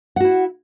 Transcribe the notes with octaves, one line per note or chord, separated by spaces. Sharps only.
E4 F#4 F#5